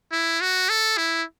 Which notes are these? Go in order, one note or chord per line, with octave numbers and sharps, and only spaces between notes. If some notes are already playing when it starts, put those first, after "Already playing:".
E4
F#4
A4
E4